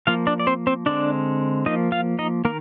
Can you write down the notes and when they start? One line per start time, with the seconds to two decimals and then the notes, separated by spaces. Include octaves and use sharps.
0.07 F3 A#3 F4 F5
0.27 D4 D5
0.40 D5
0.47 C4 C5
0.67 C4 C5
0.86 D3 G#3 C4 D4 D5
1.66 F3 A#3 D#4 D#5
1.92 F4 F5
2.19 D#4 D#5
2.45 D#3 A#3 A#4